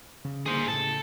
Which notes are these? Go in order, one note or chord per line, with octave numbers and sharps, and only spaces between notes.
C#3
D3 A#3 G#4 C5
A2 C#3 A4